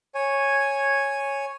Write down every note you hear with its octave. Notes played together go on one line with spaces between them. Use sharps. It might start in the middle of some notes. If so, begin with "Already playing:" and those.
C#5 G#5